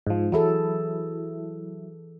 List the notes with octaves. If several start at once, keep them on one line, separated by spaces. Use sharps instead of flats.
G#2 F3
E3 F#3 E4 G#4 A4